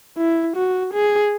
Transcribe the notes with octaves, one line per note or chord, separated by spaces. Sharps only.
E4
F#4
G#4